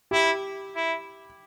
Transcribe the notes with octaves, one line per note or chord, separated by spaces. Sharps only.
E4 G4
E4